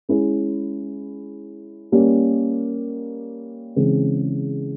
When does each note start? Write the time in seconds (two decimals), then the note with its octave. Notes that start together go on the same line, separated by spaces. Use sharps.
0.09 G#3 C#4 E4 G#4
1.92 G3 A#3 C#4
3.76 C#3 E3 G#3 C4